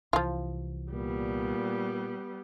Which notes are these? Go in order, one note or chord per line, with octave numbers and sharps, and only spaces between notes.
C2 E3 F3 F4
A#2 G3 B3